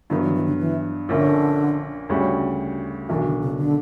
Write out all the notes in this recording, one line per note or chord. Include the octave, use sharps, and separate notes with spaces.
G2 D3 F#3 B3
E3
E3
D3
E3
A#1 A#2 D3 A#3 C#4
D2 C#3 G3 C#4 F#4
B1 B2 E3 A#3 D4 F#4
D3
C#3
D3